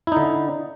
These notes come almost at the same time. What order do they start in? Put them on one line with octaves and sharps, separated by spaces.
E4 D#4 D3